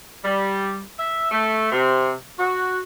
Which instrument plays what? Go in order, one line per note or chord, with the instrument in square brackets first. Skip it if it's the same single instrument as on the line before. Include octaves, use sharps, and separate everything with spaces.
[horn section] G3
E5
A3
C3
F#4